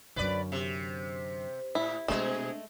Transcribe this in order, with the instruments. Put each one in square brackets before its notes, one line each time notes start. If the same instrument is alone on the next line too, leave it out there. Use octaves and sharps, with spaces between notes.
[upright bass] F#2 D3 [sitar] B4 D5
[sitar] C3
[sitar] A2 [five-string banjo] E4
[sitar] B2 G#4 [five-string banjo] G#3 A3 [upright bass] C4 D4